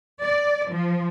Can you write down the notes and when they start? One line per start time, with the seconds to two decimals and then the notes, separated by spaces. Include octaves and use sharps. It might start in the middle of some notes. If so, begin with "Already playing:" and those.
0.25 D5
0.71 F3